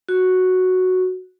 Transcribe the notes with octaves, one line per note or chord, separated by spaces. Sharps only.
F#4